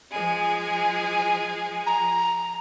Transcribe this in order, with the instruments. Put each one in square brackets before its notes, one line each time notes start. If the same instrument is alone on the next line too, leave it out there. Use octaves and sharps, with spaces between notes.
[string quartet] F3 G#3 G#4
[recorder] A#5